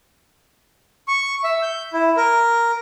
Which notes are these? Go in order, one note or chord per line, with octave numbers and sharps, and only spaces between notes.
C#6
E5
G6
E4
A#4